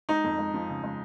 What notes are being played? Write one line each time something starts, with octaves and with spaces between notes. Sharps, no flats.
G#3 D#4
F2
G#3
F3
C#3
G#3